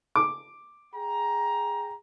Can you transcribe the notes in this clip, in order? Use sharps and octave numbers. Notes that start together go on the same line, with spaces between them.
D6
G#4 G5 A#5